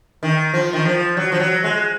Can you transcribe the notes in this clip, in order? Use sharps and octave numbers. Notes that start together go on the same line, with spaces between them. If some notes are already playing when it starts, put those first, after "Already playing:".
D#3
F3
D#3
F3
F#3
F3
F#3
G#3